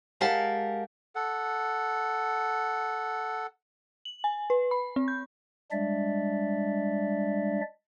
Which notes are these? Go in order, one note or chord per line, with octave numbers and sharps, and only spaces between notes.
G#3 G4 A#4 F5 F#5 A5
A4 F#5
F#7
G#5
B4
B5
C4
G6
G3 G#3 D4 D5 E5